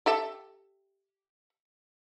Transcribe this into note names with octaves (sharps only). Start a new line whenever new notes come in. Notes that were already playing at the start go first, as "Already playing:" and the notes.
G4 A4 E5